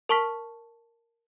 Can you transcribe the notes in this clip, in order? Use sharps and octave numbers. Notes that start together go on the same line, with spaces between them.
A#4 A5 C#6 F6 B6